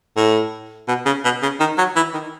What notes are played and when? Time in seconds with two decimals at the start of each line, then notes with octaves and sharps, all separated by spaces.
0.17 A2
0.88 B2
1.06 C#3
1.24 B2
1.42 C#3
1.60 D#3
1.78 F#3
1.96 E3
2.14 D#3